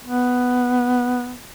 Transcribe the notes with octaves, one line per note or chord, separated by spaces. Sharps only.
B3